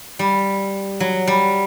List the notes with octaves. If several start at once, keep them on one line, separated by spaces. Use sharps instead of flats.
G3
F#3
G3